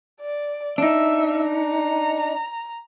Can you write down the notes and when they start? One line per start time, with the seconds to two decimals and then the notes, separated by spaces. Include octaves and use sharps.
0.21 D5
0.78 D4 D#4 E5
1.52 A#5